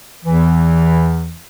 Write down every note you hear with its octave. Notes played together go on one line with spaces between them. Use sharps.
E2 E3